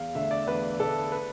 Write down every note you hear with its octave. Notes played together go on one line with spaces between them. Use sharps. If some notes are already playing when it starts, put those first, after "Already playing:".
Already playing: E2 F5
D3 A3 E5
D5
E2 B4
D3 A3 A4
B4